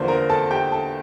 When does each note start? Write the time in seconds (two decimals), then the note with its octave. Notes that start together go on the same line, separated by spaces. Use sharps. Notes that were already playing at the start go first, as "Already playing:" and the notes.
Already playing: E2 D3 F3 A#3 C5 C6
0.08 A#4 A#5
0.29 A4 A5
0.50 G4 G5
0.72 A4 A5